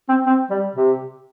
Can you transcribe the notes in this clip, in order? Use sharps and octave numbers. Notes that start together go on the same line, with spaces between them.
C4
C4
G3
C3